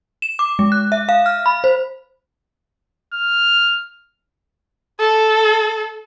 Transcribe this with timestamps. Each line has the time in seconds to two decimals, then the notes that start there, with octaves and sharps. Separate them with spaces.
0.22 E7
0.39 D6
0.59 G#3
0.72 F#6
0.92 E5
1.09 F5
1.26 F6
1.46 B5
1.64 C5
3.14 F6
4.99 A4